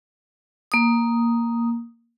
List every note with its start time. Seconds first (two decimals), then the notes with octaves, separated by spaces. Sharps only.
0.72 A#3 D#6